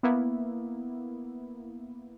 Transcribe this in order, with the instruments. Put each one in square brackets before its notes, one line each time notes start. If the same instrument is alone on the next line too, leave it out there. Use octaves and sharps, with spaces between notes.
[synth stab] A#3 B3 E4